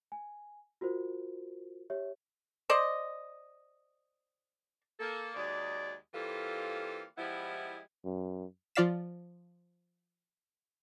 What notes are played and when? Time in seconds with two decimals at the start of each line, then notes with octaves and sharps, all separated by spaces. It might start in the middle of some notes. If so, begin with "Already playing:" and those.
0.12 G#5
0.81 F4 F#4 A#4 C5
1.90 G4 C#5 E5
2.70 C5 D5 D#5
4.99 A#3 A4
5.35 D#2 F#3 G#3 D5
6.14 E3 G3 A#3 C4 F4 A4
7.17 F3 G3 G#3 B3 E4
8.05 F#2
8.75 F3 F4 D5 F5 B6 E7